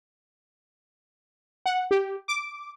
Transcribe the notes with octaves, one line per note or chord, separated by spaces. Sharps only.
F#5
G4
D6